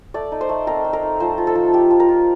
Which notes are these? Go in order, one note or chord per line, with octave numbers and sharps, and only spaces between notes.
A3 D5
D#4
C5
A3
C4 A#4
A3
A#4
D#4
F3 C5
F4
A4
F3
A#3 G4
F3
A#4
F4